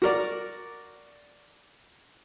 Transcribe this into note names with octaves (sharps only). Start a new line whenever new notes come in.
F#4 A#4 D5